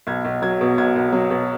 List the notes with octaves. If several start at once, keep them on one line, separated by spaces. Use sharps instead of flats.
B1 G#6
B1
F#3 G#6
B2
B1 G#6
B1
F#3
B2